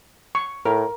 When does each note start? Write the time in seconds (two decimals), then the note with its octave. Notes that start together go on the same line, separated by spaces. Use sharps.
0.35 C#6
0.65 A2 A#4